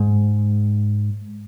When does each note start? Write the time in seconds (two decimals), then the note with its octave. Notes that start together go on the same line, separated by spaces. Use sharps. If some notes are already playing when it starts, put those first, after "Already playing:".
Already playing: G#2